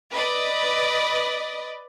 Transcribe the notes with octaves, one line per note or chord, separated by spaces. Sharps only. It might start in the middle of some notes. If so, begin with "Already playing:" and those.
B4 D5 D#5